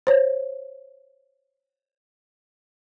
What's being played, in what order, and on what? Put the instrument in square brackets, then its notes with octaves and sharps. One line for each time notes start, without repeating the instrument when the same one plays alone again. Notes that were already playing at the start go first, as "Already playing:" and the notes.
[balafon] C5 C#5